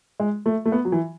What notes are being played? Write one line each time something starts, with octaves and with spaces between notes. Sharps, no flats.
G#3
A3
A3
B3
F#3
E3